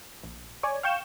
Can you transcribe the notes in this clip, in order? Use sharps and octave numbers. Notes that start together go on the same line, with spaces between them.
A#1
C#5 D5 G#5
F5 G5 C#6 G6 E7